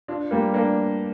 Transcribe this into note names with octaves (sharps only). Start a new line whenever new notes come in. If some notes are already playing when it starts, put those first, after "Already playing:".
D4 F4
G3 A#3
A#3 D4